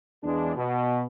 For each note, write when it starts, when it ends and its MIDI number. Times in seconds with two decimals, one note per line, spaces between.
0.23 0.55 40
0.23 0.55 56
0.23 0.55 62
0.56 1.02 47